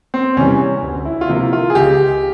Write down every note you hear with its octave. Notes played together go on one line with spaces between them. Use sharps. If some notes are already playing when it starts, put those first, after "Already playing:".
C4
E2 C3 E3 G3 C#4
D2
E4
F4
C3 F3 A#3 E4
F4
G#4
C#2 G4